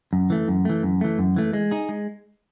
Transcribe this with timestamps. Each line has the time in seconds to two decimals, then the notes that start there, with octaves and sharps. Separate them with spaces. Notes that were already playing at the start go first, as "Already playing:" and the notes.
0.13 F#2
0.30 E3 A3
0.48 F#2
0.65 E3 A3
0.83 F#2
1.01 E3 A3
1.19 F#2
1.36 E3 A3
1.53 G#3
1.71 D#4 G#4
1.89 G#3